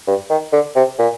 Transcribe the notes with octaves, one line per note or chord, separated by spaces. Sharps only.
G2
D#3
D3
C3
A#2